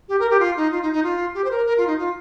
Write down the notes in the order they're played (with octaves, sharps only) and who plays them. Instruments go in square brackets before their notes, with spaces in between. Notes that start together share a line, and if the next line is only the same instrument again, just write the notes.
[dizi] G4
A#4
G4
F4
D#4
F4
D#4
D#4
F4
G4
C5
A#4
A#4
F4
D#4
F4